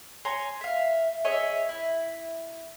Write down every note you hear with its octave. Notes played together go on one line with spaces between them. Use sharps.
C#5 G#5 A#5 C6
E5 F5
G#4 C#5 D#5 E5
E4